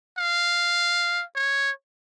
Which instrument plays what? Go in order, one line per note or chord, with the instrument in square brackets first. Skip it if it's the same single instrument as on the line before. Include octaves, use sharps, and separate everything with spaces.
[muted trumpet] F5
C#5